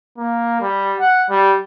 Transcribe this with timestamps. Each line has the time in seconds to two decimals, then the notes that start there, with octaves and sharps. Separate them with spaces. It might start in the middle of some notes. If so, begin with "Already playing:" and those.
0.18 A#3
0.61 G3
1.00 F#5
1.30 G3